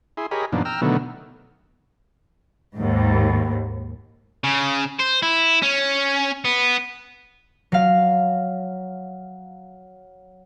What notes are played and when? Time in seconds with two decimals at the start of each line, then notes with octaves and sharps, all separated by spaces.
0.17 E4 G#4 C6
0.31 G4 G#4 A#4 C#5 D#5 B5
0.52 F#2 A#2 D#3 F3 B3 D4
0.65 G5 A#5 E6 F6
0.82 B2 D3 D#3 F#3 A3 B3
2.78 D#2 G#2
4.44 C#3
5.00 C5
5.23 E4
5.62 C#4
6.45 B3
7.72 F#3 F5